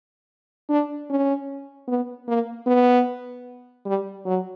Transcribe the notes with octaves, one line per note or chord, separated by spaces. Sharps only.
D4
C#4
B3
A#3
B3
G3
F#3